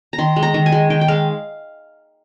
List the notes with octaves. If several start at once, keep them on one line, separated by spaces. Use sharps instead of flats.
A#5
D#3 C6
G#3
A#5
D#3
G#5
G#3
D#3 G5
G5
G#3 F5